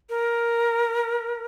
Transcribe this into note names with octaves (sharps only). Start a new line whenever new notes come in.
A#4